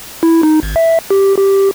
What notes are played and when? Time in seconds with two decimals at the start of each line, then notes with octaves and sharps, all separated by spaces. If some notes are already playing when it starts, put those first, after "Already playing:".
0.23 E4
0.43 D#4
0.63 G#1
0.76 E5
1.10 G4
1.39 G4